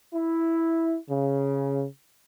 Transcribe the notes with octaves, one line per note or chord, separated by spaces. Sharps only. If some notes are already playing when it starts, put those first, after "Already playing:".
E4
C#3